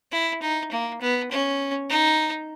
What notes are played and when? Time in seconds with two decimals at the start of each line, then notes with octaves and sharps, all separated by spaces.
0.12 E4
0.42 D#4
0.72 A#3
1.01 B3
1.31 C#4
1.90 D#4